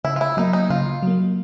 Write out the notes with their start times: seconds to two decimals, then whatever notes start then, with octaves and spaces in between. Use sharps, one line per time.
0.04 C#3 E4
0.16 F4
0.21 E4
0.37 F#3 A#3 D#4
0.53 D#4
0.70 C#3 F4
1.02 F#3 A#3